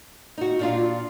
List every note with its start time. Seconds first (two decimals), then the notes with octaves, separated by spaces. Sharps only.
0.38 D#4 F#4
0.59 A#2 D4 F4